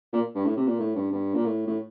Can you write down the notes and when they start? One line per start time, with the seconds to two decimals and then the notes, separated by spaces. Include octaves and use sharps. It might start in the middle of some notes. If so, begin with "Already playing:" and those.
0.13 A#2
0.35 G2
0.45 A2
0.57 C3
0.67 A#2
0.80 A2
0.95 G2
1.12 G2
1.34 A#2
1.45 A2
1.67 A2